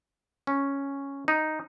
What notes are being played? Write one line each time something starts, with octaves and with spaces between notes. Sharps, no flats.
C#4
D#4